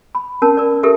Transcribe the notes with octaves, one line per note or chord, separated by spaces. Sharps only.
B5
C#4 A#4 A5
A#4 D5
G4 A4 A#4 E5